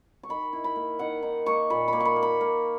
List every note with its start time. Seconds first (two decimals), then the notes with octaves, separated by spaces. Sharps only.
0.23 C#6
0.29 D#3 B5
0.53 E4
0.64 B5
0.76 A#3
0.99 D#3 F#5
1.22 D#4
1.46 A#3 C#6
1.70 A#2 B5
1.88 A#3 B5
2.00 C#6
2.05 B5
2.16 A#3
2.23 B5
2.41 A#3